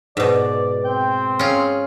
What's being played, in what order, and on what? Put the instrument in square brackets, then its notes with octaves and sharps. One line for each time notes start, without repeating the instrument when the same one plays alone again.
[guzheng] G#2 B2 [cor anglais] D5
[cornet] C4 [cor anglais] G5
[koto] C#4 F4 [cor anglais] G#4 [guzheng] A#4